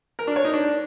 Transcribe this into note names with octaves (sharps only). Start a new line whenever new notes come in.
A#4
D4
C#5
D#4
D4